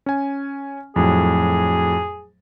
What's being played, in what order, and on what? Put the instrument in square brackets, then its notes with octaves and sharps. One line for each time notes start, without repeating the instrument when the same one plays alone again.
[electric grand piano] C#4 G#5
[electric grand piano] F2 A2 F#3 [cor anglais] G#4